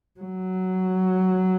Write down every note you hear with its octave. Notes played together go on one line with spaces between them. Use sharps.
F#3